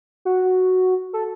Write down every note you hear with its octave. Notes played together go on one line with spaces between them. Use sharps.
F#4
A4